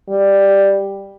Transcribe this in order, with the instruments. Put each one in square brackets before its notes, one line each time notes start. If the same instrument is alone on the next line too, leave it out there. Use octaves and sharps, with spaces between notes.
[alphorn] G3